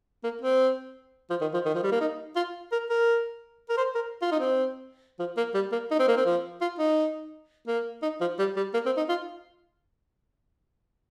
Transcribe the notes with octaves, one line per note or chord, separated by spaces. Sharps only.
A#3
C4
F3
D#3
F3
D#3
F3
G3
A#3
D#4
F4
A#4
A#4
A#4
C5
A#4
F4
D#4
C4
F3
A#3
G3
A#3
D#4
C4
A#3
C4
F3
F4
D#4
A#3
D#4
F3
G3
G3
A#3
C4
D#4
F4